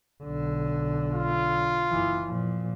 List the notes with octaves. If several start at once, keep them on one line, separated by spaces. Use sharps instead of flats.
B1 D3
F4
F#1 E3
A#2 F3